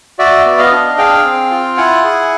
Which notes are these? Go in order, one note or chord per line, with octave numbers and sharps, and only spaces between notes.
F#4 D5 E5
B3
D#5 F5
D4
G#4 F5 G5
C4
F4
E4 F#5 G#5
G#4